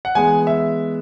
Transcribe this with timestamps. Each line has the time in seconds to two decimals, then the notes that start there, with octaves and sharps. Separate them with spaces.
0.05 F#5
0.15 E3 G#3 B3 G#5
0.47 E5